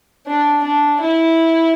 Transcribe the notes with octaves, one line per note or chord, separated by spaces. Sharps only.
D4
D4
E4